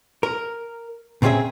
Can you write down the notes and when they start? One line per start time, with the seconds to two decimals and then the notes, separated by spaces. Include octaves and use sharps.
0.23 A#4
1.22 A#2 C#3 C4 E4 G#4 E5